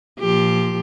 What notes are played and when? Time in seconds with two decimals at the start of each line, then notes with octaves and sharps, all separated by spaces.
0.20 A#2 F3 G4